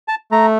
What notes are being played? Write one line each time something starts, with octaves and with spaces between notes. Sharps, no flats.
A5
A3 A#5